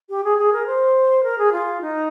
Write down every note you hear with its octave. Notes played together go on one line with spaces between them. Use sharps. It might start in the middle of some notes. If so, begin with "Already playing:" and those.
G4
G#4
G#4
A#4
C5
A#4
G#4
F4
D#4